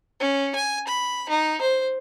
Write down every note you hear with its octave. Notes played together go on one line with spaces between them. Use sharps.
C#4
G#5
B5
D#4
C5